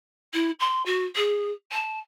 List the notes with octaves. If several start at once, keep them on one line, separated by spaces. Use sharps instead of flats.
E4
C6
F#4
G#4
A5